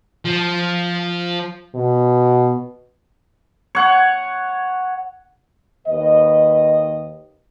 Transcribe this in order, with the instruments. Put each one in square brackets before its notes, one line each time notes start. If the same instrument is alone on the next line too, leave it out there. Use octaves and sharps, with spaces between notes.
[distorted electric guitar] F3
[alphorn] B2
[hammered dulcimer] C#5 F#5
[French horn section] D#2 B4 D#5